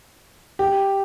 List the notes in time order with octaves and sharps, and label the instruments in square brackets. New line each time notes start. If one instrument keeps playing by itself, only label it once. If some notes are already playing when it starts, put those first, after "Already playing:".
[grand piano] G4